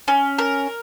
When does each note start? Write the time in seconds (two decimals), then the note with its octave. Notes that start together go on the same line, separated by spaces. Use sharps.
0.08 C#4
0.39 A#4